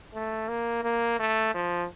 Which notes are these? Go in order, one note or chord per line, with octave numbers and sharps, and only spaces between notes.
A3
A#3
A#3
A3
F3